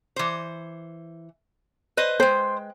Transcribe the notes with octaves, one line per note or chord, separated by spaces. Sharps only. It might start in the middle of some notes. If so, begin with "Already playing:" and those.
E3 C5
B4 C5 D#5
G#3 C5 G5